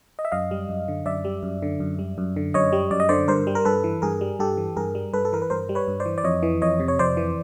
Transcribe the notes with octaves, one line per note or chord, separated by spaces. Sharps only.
D#5
E5
F#2 D#5 F5
G3
F#2
D3
F#2 D5 E5
G3
F#2
D3
F#2
G3
F#2
D3
F#2 C#5 D#5
G3
F#2 D5
D#5
D3 C5 D5
G2 A#4 C5
G3
A#4
G2 A4 B4
E3
G2 G#4 A#4
G3
G2 G4 A4
E3
G2 G#4 A#4
G3
G2 A4 B4
A4
E3 A#4
B4
G2 A#4 C5
G3
B4 C#5
G2
C5 D5
E3
D5
F2 C#5 D#5
E3
F2 C#5 D#5
C3
C#5
F2 C5 D5
E3